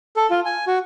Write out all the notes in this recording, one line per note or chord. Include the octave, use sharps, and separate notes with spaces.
A4
F4
G#5
F#4